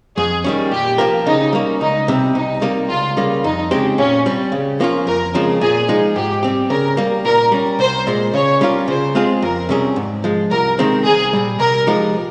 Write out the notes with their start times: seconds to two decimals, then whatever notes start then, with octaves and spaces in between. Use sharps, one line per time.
0.17 F2 G#4
0.44 D#3 G3 C#4
0.72 A#2 G4
0.98 F3 A#3 F4 A#4
1.26 C#3 D#4
1.53 G3 A#3 C#4
1.80 C#2 D#4
2.08 C3 G3 C4
2.35 C2 D#4
2.62 C3 G3 A#3 D#4
2.89 C#2 F4
3.17 C#3 G3 A#3
3.44 F2 D#4
3.71 C#3 G#3 C4 G4
3.98 A#2 C#4
4.26 G3 C4
4.52 C#3
4.80 F3 A#3 C#4 F4
5.07 F2 A#4
5.35 C#3 F3 G#3 C4
5.61 A#2 G#4
5.88 F3 G#3 D#4
6.16 G#2 G4
6.43 G3 C4 G4
6.70 C#3 A#4
6.97 G3 A#3
7.25 A#2 A#4
7.52 G3 C#4
7.79 C2 C5
8.07 A#2 G#3
8.34 C#3 C#5
8.61 G3 C#4 F4 A#4
8.88 C#3 C5
9.15 G#3 C4 F4 G#4
9.42 F2 A#4
9.69 C3 G3 C#4 G#4
9.96 G#2
10.24 F3 G#3
10.51 C2 A#4
10.79 C3 D#3 G#3 C4
11.05 C2 G#4
11.33 A#2 G3
11.59 C3 A#4
11.87 F3 G#3 D#4 G4